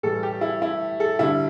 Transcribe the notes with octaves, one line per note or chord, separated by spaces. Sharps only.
A2 E3 G3 A4
G4
E4
E4
A4
G2 D3 G3 E4